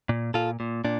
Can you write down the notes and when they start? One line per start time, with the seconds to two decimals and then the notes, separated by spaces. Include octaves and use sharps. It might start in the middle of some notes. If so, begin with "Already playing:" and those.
0.09 A#2
0.34 A#2 F4 A4
0.60 A#2
0.84 A#2 D4